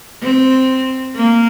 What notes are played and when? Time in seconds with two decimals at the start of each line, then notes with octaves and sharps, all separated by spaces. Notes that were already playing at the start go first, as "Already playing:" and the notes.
0.23 C4
1.16 A#3